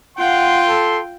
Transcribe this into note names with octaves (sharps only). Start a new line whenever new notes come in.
F4 F#5 G5 C6
A4